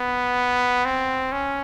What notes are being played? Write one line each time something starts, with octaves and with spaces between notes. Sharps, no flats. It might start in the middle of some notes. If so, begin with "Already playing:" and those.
Already playing: B3
C4
C#4